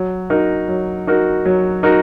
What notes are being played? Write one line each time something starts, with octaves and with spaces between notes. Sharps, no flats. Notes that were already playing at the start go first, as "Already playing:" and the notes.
Already playing: F#3
D#4 F#4 A#4
F#3
D#4 F#4 A#4
F#3
D#4 F#4 A#4